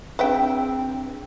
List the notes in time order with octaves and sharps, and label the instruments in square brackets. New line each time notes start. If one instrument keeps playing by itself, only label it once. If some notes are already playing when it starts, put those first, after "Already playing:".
[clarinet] C4 [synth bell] D4 G#4 [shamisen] B4 E5 G5